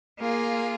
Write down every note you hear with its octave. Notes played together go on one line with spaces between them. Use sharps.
A#3 F4 G#4